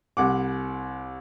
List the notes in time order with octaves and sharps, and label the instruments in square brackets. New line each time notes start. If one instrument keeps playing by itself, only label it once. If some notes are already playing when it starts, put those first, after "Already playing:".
[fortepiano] C2 F#5 D6